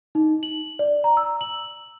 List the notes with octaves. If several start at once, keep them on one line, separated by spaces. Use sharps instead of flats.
D#4
F#7
D5
A#5
E6
F#7